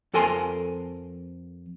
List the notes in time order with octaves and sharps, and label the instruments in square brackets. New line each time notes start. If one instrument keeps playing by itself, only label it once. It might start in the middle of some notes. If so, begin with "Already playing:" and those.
[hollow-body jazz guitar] F2 A4 A#4 G#5 C6